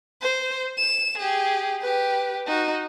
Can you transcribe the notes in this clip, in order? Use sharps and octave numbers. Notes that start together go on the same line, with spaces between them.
C5
E7
G4 G#4
G4 B4
D#4 F#4